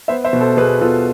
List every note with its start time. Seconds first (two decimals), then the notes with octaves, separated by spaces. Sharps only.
0.08 B3 C5 E5
0.24 C5 E5
0.33 B2
0.41 A4 C5
0.57 B2 G#4 B4
0.81 B2 F4 A4